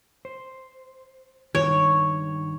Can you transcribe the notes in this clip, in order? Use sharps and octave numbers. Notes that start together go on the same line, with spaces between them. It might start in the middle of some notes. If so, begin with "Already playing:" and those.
C5
G2 D#3 C#5